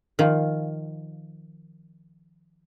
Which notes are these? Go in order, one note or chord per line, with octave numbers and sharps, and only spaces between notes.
D#3 F3